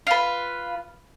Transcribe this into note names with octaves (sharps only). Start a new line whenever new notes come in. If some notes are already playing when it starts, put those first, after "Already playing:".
F4 B4